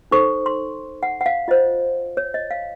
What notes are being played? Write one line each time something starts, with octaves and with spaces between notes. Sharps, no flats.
D#4 A4 C5 C#6
C6
F#5
F#5
F5
F4 C5 D#5
C#5
D#5
F5